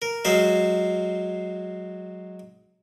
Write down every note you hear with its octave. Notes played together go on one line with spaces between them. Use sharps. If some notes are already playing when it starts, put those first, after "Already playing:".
A#4
F#3 G#3 F#4 C5 E5 F5